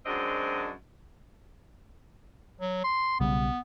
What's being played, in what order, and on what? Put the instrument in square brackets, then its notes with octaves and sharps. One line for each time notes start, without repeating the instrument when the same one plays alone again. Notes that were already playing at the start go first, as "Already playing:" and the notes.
[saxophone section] F#2 F#3 G#3 C4 D4 D#5
[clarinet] F#3
C6
[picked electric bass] B1 C#3 G3 [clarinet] B3